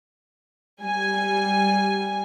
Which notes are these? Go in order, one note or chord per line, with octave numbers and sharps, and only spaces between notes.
G3 G#5